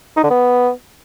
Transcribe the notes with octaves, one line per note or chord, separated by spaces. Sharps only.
D#4
D3
B3